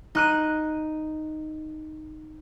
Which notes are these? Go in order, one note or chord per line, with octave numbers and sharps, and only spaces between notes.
D#4 F#6 D#7